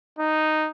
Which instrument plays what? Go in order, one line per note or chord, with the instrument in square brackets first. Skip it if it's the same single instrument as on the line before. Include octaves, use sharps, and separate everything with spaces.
[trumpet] D#4